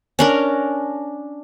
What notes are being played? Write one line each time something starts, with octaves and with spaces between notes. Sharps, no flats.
C#4 D4 A#4